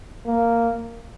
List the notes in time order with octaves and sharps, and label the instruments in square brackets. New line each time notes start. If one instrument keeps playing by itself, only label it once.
[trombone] A#3